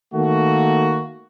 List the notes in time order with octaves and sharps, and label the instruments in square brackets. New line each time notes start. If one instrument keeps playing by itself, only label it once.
[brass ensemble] D#3 A3 A#3 F#4